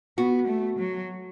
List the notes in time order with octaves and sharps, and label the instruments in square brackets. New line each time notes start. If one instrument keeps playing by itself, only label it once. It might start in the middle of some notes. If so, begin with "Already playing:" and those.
[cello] B3 [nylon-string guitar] F#4
[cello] A3
F#3